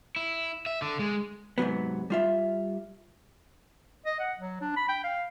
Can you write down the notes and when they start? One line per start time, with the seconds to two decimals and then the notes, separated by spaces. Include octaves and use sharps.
0.16 E4
0.66 E5
0.82 D3
0.99 G#3
1.58 G#2 C3 F#3 B3
2.10 G3 F4 E5
4.06 D#5
4.19 F#5
4.38 F#3
4.61 D4
4.77 B5
4.89 G5
5.04 F5